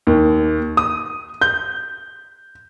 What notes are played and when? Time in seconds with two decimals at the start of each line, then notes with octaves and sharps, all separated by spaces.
0.07 D#2
0.77 D#6
1.41 G6